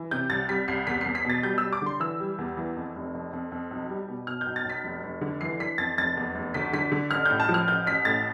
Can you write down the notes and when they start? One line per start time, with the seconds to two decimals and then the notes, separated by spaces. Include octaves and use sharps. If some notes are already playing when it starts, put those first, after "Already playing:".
Already playing: E3
0.11 C3 G6
0.30 C2 A6
0.49 G3 B6
0.68 C2 C7
0.87 E2 B6
1.01 E2 C7
1.15 B6
1.25 B2 A6
1.43 G3 G6
1.58 E6
1.63 G3
1.73 D6
1.82 D3 C6
2.00 E3 E6
2.20 G3
2.38 E2
2.57 E3
2.76 F2
2.96 F1
3.15 F2
3.33 F2
3.52 F2
3.71 B1
3.89 G3
4.08 B2
4.27 B2 F6
4.41 G6
4.46 B1
4.56 A6
4.65 B1 B6
4.84 F1
5.03 F1
5.21 D3
5.41 E3 C7
5.60 E3 B6
5.78 F2 A6
5.97 F1 A6
6.17 E2
6.35 F1
6.54 D2 B6
6.73 D3 B6
6.92 D3
7.11 A1 F6
7.26 A2 G6
7.40 A5
7.49 F3
7.54 F6
7.67 A1 G6
7.87 A1 B6
8.05 A2 A6